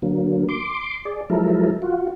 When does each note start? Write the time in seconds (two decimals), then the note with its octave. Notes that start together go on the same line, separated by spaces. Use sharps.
0.02 D3 F#3 A#3
0.49 C6 D6
1.05 G#4 D5
1.30 F3 F#3 G#3 E4 A4 A#4
1.82 F4 F#4